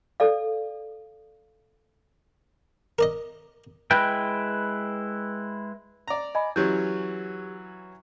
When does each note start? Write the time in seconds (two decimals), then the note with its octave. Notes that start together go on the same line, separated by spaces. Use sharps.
0.20 A4 D5 F5
2.99 A#4 D5 D#5
3.91 G#3 E4 B4 G5
6.08 D5 A#5
6.35 D#5 G#5 B5
6.56 E3 F#3 C#4 G4 G6